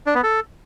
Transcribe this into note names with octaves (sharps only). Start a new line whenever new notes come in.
D4
B3
A4